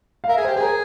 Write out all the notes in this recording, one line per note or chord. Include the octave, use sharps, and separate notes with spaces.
F5
A#4 E5
G#4
C5
G4
G#4 A#4 C5